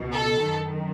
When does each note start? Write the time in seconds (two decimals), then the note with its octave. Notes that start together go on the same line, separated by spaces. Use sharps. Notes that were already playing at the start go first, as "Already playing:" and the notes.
Already playing: C#2 B2
0.12 A4
0.40 F#2 D#3